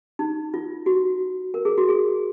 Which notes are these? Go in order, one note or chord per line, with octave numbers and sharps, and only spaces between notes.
D#4
F4
F#4
A#4
G#4
F#4
G#4